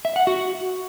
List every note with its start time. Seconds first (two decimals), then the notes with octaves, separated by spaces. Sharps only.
0.05 E5
0.16 F#5
0.27 F#4